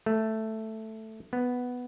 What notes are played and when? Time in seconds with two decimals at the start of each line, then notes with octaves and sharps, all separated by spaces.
0.06 A3
1.33 B3